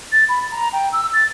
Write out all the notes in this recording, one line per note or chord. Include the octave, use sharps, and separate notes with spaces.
A6
B5
A#5
G5
E6
A6